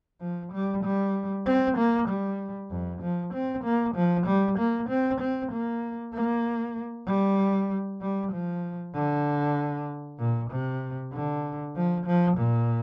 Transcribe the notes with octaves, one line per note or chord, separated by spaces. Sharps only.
F3
G3
G3
C4
A#3
G3
F2
F3
C4
A#3
F3
G3
A#3
C4
C4
A#3
A#3
G3
G3
F3
D3
A#2
C3
D3
F3
F3
A#2